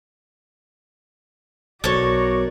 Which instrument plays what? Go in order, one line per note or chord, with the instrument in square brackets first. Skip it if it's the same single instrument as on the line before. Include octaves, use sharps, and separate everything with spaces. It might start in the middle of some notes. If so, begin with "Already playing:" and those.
[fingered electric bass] B1 B2 [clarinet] F#4 [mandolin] A4 C#5 [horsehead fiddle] A#4 D5